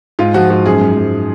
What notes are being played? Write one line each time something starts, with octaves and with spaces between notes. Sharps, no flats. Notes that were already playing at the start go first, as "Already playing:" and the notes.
G#2 F4
F3 F#4
G#2 F#4
F#2 G#4
F#2
F#2